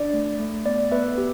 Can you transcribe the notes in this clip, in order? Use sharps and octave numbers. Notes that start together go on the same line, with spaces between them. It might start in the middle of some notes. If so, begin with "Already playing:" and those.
Already playing: D4 D5
A3
A3
B3 D5
B3 B4 E5
G4